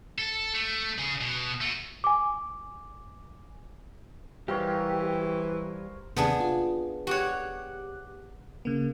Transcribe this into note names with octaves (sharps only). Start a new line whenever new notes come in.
A4
A3
C#3 G#4
B2
A3 F#4
G#5 D6
E3 G3 G4 A#4 C5 C#5 F5
D#2 C3 B3 D4 G#4
F4
F#4 G4 C#5 D6 F#6
C#3 A#3